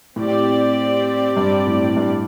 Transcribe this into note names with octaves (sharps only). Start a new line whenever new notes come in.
A2 C4 G4 D5
G2
A2
G2